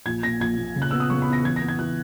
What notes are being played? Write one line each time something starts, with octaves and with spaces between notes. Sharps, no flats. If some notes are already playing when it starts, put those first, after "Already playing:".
A#1 G#6
A#2 A#6
A#1 G#6
A#2
C#3
F#6
B3 E6
D#6
C#3 C#6
B5
E2
A#6
E3 G#6
A#6
B3
G#6
E3 F#6